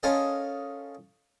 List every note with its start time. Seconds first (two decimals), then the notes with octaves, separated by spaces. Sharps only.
0.03 C#4 F4 A4 A#4 D#5